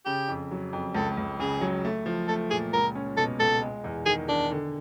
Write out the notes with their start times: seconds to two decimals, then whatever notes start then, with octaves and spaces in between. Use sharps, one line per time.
0.06 C#3 G4
0.28 F2
0.51 F#3
0.73 F2
0.95 C#2 A4
1.17 C#2
1.40 C#3 G#4
1.61 F#3
1.85 A3
2.06 F3
2.28 A3 A4
2.51 A#2 G#4
2.73 C#2 A#4
2.95 C#4
3.17 B2 A4
3.40 C#2 A4
3.61 G#3
3.84 E2
4.06 D#3 G#4
4.28 D#3 D4
4.51 D3